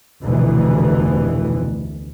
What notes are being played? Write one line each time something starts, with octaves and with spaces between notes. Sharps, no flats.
F1 D2 B2 E3